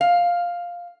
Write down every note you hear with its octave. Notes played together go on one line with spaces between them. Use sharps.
F5